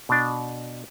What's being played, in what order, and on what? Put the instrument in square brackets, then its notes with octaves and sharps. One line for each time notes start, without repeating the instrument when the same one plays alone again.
[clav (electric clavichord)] B2 D4